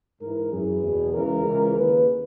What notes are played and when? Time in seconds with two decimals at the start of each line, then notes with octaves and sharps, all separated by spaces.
0.21 G#2 E3 A#4
0.52 F#2 E3 G#4
0.83 E2 B2
1.13 C#2 C#3 E3 A#4
1.44 C#2 C#3 E3
1.74 D#2 C#3 E3 B4